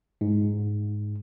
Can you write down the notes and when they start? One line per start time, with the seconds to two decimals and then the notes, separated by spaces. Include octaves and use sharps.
0.21 G#2